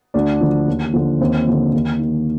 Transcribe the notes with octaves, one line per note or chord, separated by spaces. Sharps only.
D2 D4
D3 F3
D#2
D3 F3
D#2 C4
D3 F3
D#2
D#3